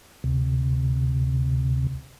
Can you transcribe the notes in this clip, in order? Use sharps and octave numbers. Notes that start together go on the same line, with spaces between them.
D2 C3